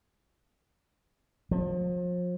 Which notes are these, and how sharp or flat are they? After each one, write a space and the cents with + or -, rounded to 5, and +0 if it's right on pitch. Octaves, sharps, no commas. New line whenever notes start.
F3 +35